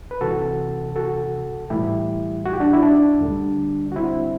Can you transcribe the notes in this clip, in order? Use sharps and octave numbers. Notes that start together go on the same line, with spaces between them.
B4
C2 C3 E3 F#4 A4
F#4 A4
A2 E3 G3 E4 G4
F#4
G4
D4 F#4
E4
D4
D2 D3 G3
F#4
C4 E4